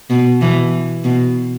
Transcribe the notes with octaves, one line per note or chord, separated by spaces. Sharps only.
B2
B2 E3
B2